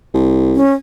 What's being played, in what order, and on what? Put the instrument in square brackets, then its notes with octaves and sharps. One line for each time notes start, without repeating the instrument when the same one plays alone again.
[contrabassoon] C2
[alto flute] C#4